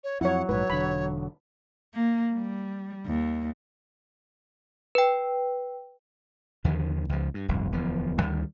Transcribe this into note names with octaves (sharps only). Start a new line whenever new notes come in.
C#5
F2 F#3 E4 C#5 F#5
A#1 G#2 B4 C#5
E1 D3 B5
A#3
G3
D#2
B4 G5
D#2 D3 D#3 F3
C#2 F3
G2
D1 G1 C2 F2
D1 E2 F3
D2 D#3 G3